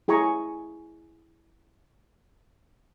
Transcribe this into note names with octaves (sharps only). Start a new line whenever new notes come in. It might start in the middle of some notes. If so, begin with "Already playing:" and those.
E4 G#4 G#5 A#5 C#6